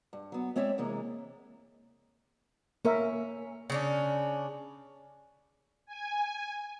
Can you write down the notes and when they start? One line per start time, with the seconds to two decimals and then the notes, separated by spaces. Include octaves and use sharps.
0.13 G2
0.32 F#3 B3
0.56 G#3 C4 C#5 D5 E5
0.78 C3 E3 G#3 A#3
2.85 A#3 C#4 A#4 E5
3.70 C#3 C#4 D4
5.86 G#5